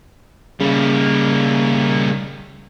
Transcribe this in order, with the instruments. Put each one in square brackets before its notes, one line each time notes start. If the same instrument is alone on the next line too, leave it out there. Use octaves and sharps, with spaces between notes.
[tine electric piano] C#3 [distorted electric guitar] G3 A#3